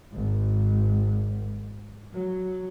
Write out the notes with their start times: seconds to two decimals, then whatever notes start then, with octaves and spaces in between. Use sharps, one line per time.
0.13 G#1
2.12 F#3